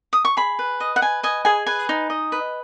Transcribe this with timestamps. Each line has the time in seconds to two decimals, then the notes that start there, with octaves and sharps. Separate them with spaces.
0.13 D#6
0.25 C#6
0.37 G#4 B5
0.59 B4
0.80 D#5
0.96 F#5
1.02 B4 G#5
1.23 D#5 G#5
1.45 G#4 G#5
1.66 B4 G#5
1.89 D#4
2.10 D#5
2.32 B4